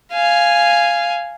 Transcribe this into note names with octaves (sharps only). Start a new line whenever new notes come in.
F5 G#5